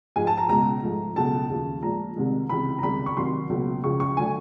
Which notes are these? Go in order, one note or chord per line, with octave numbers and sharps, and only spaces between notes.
G#2 F3 G#3 G#5
A5
A#5
C#2 B2 G#3 A#5
G#2 F3 A3
C#2 B2 F#3 A3 A5
D#2 C#3 F3
A#2 F3 G#3 A#5
C2 C3 D#3 G#3
C#2 C3 E3 B5
A#5
C#2 C3 D#3 G3 B5
C#6
C2 C3 D#3 F#3 C6
C#2 B2 F#3 A#3
C#2 C#3 F3 C#6
C#6
D3 F#3 A3 G#5